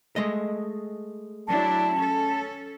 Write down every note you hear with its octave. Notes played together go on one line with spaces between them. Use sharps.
G#3 A3 D#5
F#3 D4 E4 A5
C#4 A4